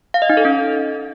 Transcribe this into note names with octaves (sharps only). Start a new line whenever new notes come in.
F5
D#5
D#4
A4
C#4